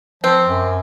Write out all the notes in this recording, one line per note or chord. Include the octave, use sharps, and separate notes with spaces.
F3 C4
F#2